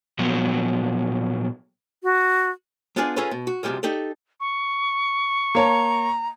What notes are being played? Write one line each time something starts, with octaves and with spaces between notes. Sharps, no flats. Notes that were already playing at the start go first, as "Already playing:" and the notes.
A#2 F3 F#3 B3
F#4
G#3 B3 D4 F4 G#4 D5
C#4 F4 G#4 A4 B4 C#5
B2
F#4
C2 F#2 C3 F3 G3 G#3
D#4 G4 A4 D5
C#6
A#3 C#5 A5 A#5